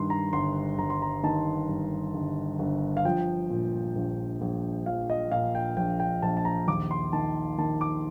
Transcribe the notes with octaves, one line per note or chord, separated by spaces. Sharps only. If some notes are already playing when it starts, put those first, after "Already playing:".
Already playing: G2 D#3 C6
A#5
G1 C6
G1 A#5
C6
A#5
D#3 A5
G2
G1
G1
F5
F3 G5
A#2
A#1
A#1
F3 F5
D#5
A#2 F5
G5
A#1 G5
G5
A#1 A5
A5
A#5
D#2 D6
C6
D#3 A5
D#3 A5
D6